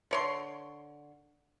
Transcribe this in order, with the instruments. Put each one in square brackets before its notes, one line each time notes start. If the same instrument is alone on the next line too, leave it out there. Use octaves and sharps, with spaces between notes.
[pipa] D3 C#5 C6